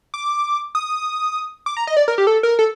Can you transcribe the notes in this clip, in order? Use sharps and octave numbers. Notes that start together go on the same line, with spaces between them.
D6
D#6
D6
A#5
D#5
D5
A#4
G4
A4
A#4
A4